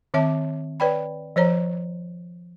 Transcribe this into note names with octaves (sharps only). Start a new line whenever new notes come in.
D#3 C4 C#5 E5 A5 D6
B4 C#5 D5 G5 B5
F3 C5 C#5 A#5